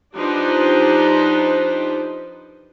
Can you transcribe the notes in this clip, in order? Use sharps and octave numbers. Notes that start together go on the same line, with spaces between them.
F3 D4 D#4 G4 B4 C5